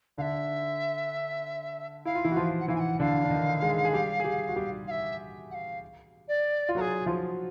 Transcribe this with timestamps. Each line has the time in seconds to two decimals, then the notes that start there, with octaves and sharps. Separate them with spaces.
0.18 D3 D4 E5 F5
2.05 E4 F5
2.15 F4
2.24 E3 E4
2.31 F#4
2.36 F3 F4
2.60 F#5
2.68 E3 E4 F5
2.75 G#5
2.79 F#5
2.99 D3 D4 F5
3.24 D4
3.30 D#3 D#4
3.62 G#3 G#4
3.85 G#4
3.93 G3 G4
4.20 G#4
4.24 G3 G4
4.48 F#4
4.56 G3 G4
4.87 F5
4.90 E5
5.50 F#5
5.54 F5
6.28 D5
6.69 F4
6.75 F#3 F#4 A#4
6.80 G#4
7.06 F3 F4